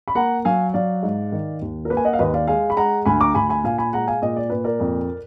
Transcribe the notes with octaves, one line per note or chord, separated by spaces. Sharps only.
B5
A#3 F#5 A#5
F#3 F5 G#5
F#3 D5 F5
G#2
D#3
D#2
A#4
A#3 B4
G#5
D#5 F#5
F5
D#2 B4 D#5
D5 F5
G#3 F5 G#5
B5
G#3 F#5 A#5
D2 G#5 B5
A#5 D6
D2 G#5 B5
G#5 B5
A#2 F5 G#5
G#5 B5
G#3 F#5 A#5
F5 G#5
A#2 D#5
D5
A#2 B4
A#4 D5
F2